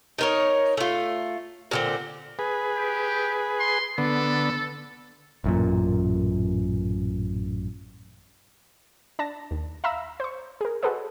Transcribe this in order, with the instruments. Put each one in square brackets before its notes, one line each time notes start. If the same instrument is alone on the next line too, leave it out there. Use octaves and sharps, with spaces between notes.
[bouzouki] D#4 A#4 C#5
A3 F4
A#2 D3 C4
[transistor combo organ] G#4 B4
[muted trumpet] G4
C6
[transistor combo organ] D3 B3 [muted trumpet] A4
[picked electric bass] A1 F#2 A#2
[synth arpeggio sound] D4 A5 A#6
D#2
E5 F5 A#5 B5 E6
C5 C#6
G#4 A#4
F#4 G#4 A4 B4 C5 D#5